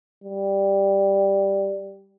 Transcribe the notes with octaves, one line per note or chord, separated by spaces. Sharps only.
G3